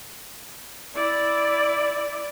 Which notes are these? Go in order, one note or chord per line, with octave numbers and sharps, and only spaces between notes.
E4 D5